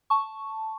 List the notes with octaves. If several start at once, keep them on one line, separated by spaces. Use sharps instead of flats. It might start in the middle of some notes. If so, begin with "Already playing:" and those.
A5 C#6